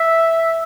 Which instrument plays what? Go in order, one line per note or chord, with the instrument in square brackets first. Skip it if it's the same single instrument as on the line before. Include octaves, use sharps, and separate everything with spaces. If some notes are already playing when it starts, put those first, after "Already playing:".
Already playing: [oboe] E5